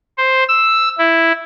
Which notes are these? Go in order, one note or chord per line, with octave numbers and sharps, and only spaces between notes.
C5
E6
E4